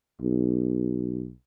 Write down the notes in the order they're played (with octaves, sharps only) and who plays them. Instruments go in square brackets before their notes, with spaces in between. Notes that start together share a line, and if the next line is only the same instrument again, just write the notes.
[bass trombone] B1